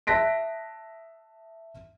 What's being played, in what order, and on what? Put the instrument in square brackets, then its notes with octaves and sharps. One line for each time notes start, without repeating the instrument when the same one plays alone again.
[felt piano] E5 A5 F#6 A#6 B6 D7